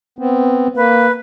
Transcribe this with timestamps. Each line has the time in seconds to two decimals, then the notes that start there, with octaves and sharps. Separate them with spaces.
0.19 B3 C4
0.76 A#3 B4